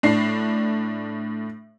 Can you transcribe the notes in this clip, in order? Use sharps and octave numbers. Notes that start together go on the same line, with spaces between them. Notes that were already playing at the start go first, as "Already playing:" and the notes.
A2 D4 C7